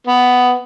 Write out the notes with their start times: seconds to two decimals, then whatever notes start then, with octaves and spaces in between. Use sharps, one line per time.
0.07 B3